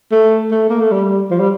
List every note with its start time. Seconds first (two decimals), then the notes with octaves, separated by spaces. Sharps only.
0.12 A3
0.51 A3
0.69 A#3
0.80 A3
0.91 G3
1.31 F3
1.40 G3